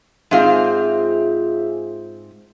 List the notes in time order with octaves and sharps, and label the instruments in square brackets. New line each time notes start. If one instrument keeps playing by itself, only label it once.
[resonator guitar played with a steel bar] G#2 C4 F5 [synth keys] F4 G#4 E5